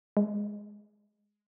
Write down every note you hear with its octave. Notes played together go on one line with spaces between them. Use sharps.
G#3